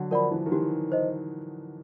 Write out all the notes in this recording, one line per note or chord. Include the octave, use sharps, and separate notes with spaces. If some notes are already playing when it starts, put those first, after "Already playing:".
Already playing: D3 F#3
F3 A#4 D5 F#5 B5
E3
D#3
E3 G4
C5 D#5